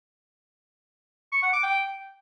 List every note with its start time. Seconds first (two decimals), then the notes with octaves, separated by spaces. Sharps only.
1.32 C#6
1.43 F#5
1.53 D6
1.63 G5